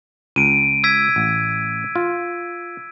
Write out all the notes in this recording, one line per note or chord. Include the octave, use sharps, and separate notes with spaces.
C#2 D7 D#7
E6 G#6 B6
A1
F4